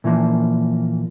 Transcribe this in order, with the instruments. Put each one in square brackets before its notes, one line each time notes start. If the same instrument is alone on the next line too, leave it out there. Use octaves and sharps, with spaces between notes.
[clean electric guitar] A#2 E3 F3 A#3